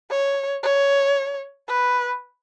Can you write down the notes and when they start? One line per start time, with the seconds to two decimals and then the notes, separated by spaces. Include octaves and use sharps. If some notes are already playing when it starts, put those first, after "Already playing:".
0.11 C#5
0.63 C#5
1.68 B4